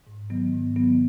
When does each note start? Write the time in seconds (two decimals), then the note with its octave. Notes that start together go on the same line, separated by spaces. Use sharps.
0.07 G#2
0.30 D#3 F#3 B3
0.53 G#2
0.76 D#3 F#3 B3